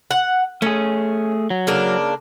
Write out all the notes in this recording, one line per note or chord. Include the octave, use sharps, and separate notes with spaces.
F#5
A3 C#4 G#4
F#3
C#3 A#3 D4